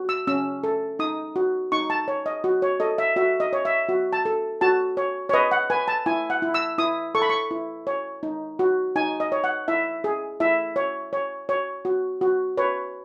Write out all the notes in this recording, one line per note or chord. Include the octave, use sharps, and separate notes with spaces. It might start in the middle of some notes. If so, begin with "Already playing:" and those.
Already playing: F#4
E6
C#4 E6
A4
D#4 D#6
F#4
D#4 C#6
A5
C#5
D#5
F#4
C#5
A4 D#5
E5
F#4 E5
D#5
C#5
E5
F#4
A5
A4
F#4 A5
C#5
C#5
B4 D#5
F#5
B4 G#5
A5
E4 G#5
F#5
E4
E6
E4 D#6
A4 C#6
B5
C#6
E4
C#5
D#4
F#4
D#4 G#5
D#5
C#5
F#5
E4 E5
G#4
E4 E5
C#5
C#5
C#5
F#4
F#4
B4 C#5